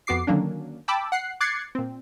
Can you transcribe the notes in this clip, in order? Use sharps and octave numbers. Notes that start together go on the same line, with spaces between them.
F2 B3 F#4 D6 C7
D3 D#3 F#3 A#3 C#4 D4
G5 A5 B5 D6 E6
F#5 F#6 C7
D6 F#6 G#6 A6 C7 C#7
A#2 C4